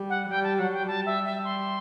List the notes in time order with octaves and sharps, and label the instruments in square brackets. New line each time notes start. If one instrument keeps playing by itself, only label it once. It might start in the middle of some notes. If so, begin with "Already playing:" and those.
Already playing: [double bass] G3
[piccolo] F#5
[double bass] G3 [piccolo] G5
[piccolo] A5
[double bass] F#3 [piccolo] F#5
[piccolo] G5
[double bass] G3 [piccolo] A5
[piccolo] E5
E5
C6